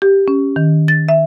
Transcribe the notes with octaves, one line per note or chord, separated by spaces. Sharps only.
G4
C#4
D#3
A6
E5